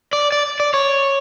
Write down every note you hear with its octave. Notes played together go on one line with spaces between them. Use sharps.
D5
D5
D5
C#5